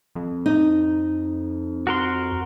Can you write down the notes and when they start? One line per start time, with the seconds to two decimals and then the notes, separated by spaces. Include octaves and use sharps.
0.15 F2
0.46 D#4
1.87 F#4 A#4 C6